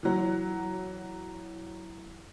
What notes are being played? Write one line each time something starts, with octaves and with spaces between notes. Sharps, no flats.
E3 F#3